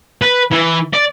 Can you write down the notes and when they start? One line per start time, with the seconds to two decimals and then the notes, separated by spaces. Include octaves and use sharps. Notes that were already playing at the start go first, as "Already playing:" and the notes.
0.22 B4
0.52 E3
0.93 D5